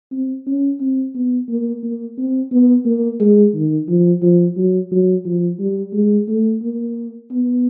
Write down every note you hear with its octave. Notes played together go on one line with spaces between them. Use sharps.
C4
C#4
C4
B3
A#3
A#3
C4
B3
A#3
G#3
D#3
F3
F3
F#3
F#3
F3
G3
G#3
A3
A#3
B3